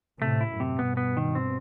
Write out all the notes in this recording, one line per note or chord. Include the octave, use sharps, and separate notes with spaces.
A2 C3 A3
E4
F#2 A2
C3
G2 B2 B3
B3
D#3
C4